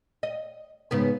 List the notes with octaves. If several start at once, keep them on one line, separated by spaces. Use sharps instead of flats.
D#5
G#2 C#3 B3